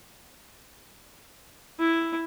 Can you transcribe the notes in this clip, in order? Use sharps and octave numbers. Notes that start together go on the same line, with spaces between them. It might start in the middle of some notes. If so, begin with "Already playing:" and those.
E4